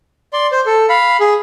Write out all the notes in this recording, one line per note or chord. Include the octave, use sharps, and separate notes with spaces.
D5 C6
C5
A4
F5 B5
G#4